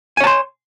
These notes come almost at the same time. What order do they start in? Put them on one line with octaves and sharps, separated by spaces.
G#5 C#5 A5 C6